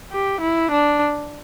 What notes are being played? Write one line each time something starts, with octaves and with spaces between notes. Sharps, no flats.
G4
E4
D4